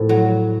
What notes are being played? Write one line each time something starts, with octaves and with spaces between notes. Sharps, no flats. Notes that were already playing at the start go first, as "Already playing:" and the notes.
Already playing: A2 F3
F#3